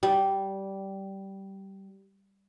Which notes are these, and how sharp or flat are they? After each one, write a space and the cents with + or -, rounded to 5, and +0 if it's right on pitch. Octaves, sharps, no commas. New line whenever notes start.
G3 -15